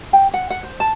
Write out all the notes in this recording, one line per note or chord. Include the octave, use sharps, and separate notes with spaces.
G5
F#5
F#5
C5
A5